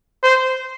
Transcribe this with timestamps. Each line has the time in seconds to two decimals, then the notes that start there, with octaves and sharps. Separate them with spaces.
0.23 C5